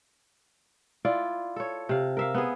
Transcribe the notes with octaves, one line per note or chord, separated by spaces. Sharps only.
E4 F4 D5
A4 C#5
C3 F5
A#4 E5 F5
B3 G#4